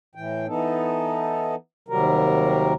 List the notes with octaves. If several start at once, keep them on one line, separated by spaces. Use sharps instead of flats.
A2 E3 G5
E3 B3 D#4 A4
D#2 C3 F#3 G3 A#4